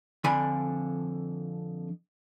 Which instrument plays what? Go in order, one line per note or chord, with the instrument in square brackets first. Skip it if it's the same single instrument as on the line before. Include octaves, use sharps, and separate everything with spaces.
[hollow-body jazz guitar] F2 D3 F3 D4 G#5 B5